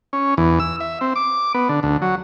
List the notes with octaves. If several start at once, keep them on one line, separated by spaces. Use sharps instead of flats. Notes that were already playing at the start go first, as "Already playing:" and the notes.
C#4
E2
E6
E5
C4
D6
B3
D3
D2
F#3